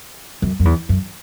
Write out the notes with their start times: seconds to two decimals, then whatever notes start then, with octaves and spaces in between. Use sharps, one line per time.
0.42 F#2
0.60 F#2
0.65 E2
0.89 F#2